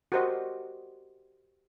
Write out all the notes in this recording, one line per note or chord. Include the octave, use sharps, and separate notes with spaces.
F#4 G4 A#4 C5 D5 D#5